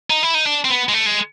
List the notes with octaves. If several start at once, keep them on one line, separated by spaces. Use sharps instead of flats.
D#4
E4
D#4
D4
C4
B3
G#3
A3
G#3